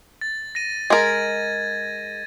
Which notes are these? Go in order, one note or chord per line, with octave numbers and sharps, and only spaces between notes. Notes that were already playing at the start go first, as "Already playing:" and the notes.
A6
A#6 D#7
G#3 A#4 G#6 A6